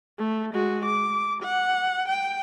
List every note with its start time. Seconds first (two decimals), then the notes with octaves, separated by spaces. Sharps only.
0.18 A3
0.53 G#3 F#4
0.85 D6
1.43 F#5
2.09 G5